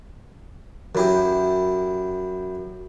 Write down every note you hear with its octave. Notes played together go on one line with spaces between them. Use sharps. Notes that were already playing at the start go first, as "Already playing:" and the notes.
F#2 E4 G4